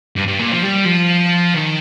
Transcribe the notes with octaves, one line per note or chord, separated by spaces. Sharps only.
G2
G2
A#2
F3
G3
F3
D#3